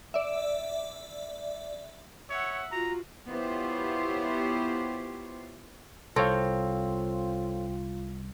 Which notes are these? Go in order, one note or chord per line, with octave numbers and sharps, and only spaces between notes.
D5 E5
C#5 E5 F#5
F4 F#4 A#5
B3 E4 F4 G4 C5 C#5
C2 C4 F4 A4 C#5 F5